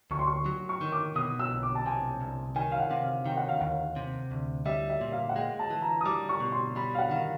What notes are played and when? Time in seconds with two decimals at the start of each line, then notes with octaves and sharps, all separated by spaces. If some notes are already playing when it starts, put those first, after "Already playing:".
0.11 D2 C#6
0.19 C6
0.27 C#6
0.46 F#3
0.69 C#6
0.81 D#3
0.92 D6
1.16 B2 D#6
1.39 E6
1.51 B1
1.63 D6
1.75 A5
1.86 C3 G#5
2.20 C2
2.56 D#3 G#5
2.72 F5
2.80 F#5
2.91 C3
3.03 F5
3.26 D#3 G5
3.37 F#5
3.49 F5
3.60 D#2 F#5
3.96 C3
4.31 D2
4.66 G3 E5
4.90 E5
5.01 A#2
5.12 F5
5.29 F#5
5.35 G#3 G5
5.59 A5
5.70 E3
5.82 A#5
6.01 D#6
6.06 G3 D6
6.29 C#6
6.40 B2
6.52 C6
6.76 G3 B5
6.94 F5
6.98 F#5
7.11 D#3 F5